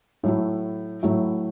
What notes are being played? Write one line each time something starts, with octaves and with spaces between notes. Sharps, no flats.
A2 F#3 A3 E4
A2 F#3 A3 E4